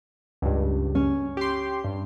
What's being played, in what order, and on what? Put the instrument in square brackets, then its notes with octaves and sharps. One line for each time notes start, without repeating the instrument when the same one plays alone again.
[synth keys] C#2 G2
[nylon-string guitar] C#4
[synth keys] G4 C6
G2